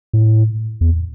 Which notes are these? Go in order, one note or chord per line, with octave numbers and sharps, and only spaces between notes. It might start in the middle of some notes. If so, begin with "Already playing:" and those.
A2
E2